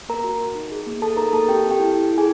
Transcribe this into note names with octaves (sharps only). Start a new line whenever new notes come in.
A#3 A#4 A#5
F#4
F#4
D#4
G#4
A#3
G#4 A4 A5
D#4 A#4 A#5
A#3 A4 A5
C4 G4 G5
A4
G4 G5
E4
A4
E4
G#4 G#5